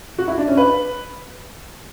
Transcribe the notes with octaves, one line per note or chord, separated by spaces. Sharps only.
F#4
E4
D4
C#4
B4